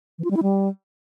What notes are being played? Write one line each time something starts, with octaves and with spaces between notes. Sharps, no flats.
E3
F4
G3
E4
G3